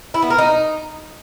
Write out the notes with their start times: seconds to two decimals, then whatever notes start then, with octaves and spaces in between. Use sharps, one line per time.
0.14 E4
0.22 B3
0.30 A#4
0.38 D#4